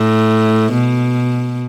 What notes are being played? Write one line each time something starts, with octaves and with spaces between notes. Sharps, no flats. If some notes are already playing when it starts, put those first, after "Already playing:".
Already playing: A2
B2